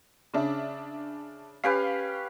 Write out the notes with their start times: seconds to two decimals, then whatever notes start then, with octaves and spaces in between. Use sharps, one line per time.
0.34 C#3 D4 E5
1.64 C#4 G4 B4 F5